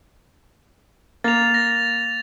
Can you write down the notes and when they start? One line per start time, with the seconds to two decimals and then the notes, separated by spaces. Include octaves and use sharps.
1.24 A#3 A6 F7
1.54 A#6